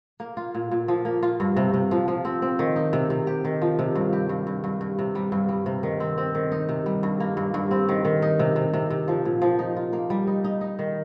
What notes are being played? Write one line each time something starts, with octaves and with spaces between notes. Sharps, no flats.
A#3
F4
A#2
A#2
F3
A#3
F4
G2
C3
C3
F3
F3
C4
C4
D#3
D#4
C3
C3
G4
D#3
F3
C3
G2
G4
G2
G2
G2
G2
C3
G3
G2
G3
C3
D#3
C4
C4
D#3
D#4
C3
G3
G2
A#3
G2
G2
C4
D#3
D#3
D#4
C3
C3
C3
C3
F3
A#2
F3
D#4
F4
A#3
G3
D#4
D#4
D#4
D#3